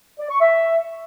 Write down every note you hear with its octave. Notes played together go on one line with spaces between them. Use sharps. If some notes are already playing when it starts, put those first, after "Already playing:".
D5
C#6
E5